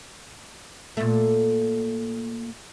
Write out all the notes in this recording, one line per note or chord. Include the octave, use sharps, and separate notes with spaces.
A#2 A3